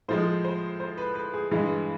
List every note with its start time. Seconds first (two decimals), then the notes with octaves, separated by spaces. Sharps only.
0.08 A2 F3 G#3 C5
0.44 C5
0.80 C5
0.97 B4
1.15 B4
1.34 G#4
1.51 G2 E3 G#3